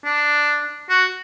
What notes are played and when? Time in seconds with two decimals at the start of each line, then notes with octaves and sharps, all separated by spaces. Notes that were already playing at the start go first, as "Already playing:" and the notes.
0.05 D4
0.90 F#4